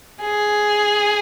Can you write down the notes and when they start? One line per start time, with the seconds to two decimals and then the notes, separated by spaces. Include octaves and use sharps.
0.21 G#4